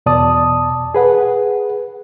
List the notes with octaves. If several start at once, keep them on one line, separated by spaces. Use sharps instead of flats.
E2 B2 D5 A5 D#6
G#4 B4 F#5